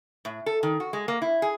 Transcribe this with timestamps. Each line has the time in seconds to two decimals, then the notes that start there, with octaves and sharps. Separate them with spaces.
0.25 A2
0.46 A4
0.63 D#3
0.80 F#4
0.93 G#3
1.08 A#3
1.22 E4
1.42 G#4